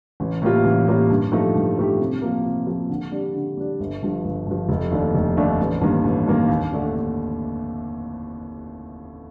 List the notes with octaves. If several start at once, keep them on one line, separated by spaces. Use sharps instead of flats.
A1
A2 G3 A#3 F4
A1
A2 G3 A#3 F4
G2
F3 A3 D#4 G4
G2
F3 A3 D#4 G4
C3
F3 A#3
C3
F3 A#3
D3
G3 D4
D3
G3 D4
G1
G2 F3
G1
G2 F3
F1
D#2 D#3 A3 D4
F1
D#2 D#3 A3 D4
A1
G2 D#3 A#3
A1
G2 D#3 A#3
D#2
D3 A3 D4
D#2